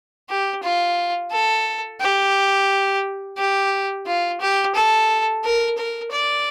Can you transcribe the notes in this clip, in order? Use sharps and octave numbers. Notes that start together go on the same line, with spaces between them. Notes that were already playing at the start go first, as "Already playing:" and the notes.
G4
F4
A4
G4
G4
F4
G4
A4
A#4
A#4
D5